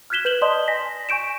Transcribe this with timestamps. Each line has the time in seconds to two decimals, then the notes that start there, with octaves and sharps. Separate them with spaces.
0.10 F6 F#6 G#6 B6 E7 G7
0.25 B4 G6 E7 F#7 G7
0.42 D5 D#5 A5 C6 D#6
0.68 G#5 A#6 B6
1.09 G#5 C#6 G6 D7 E7